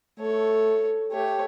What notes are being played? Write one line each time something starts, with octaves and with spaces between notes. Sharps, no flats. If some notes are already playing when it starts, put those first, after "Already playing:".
A3 A4 C#5
A3 G4 C#5